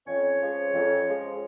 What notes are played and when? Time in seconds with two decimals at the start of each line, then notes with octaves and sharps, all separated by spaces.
0.06 F2 C#4 C#5
0.41 F3 G#3
0.74 F2
1.07 F3 G#3